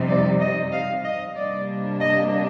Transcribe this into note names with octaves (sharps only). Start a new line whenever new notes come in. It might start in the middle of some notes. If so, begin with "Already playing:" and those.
Already playing: F2 C3 G3 C4 D#4
D5
D#5
F5
D#5
C3 G3 A#3 D4 D5
D#5